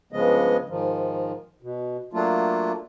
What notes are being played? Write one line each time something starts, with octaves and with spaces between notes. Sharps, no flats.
G2 C#3 F3 G#3 B3 D#5
G#2 D#3 F3
B2
F#3 A3 A#3 D4 F4